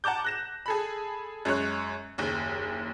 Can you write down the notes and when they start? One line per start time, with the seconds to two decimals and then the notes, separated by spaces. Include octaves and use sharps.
0.04 F#5 A5 A#5 D6 G6
0.25 F#6 A#6 E7
0.66 G#4 A4 B5
1.45 F#2 G#3 C#5 F#6
2.18 F#1 D#2